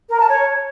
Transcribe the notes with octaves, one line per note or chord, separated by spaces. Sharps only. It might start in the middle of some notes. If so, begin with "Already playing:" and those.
A#4
A5
C#5